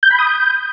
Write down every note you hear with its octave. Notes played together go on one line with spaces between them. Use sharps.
G6
B5
D#6
G6